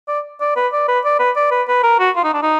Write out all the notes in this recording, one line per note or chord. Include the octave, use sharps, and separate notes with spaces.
D5
D5
B4
D5
B4
D5
B4
D5
B4
B4
A#4
F#4
F4
D#4
D4
D#4